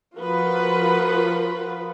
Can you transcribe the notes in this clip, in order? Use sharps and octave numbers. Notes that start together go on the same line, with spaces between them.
F3 F4 F#4 A#4 B4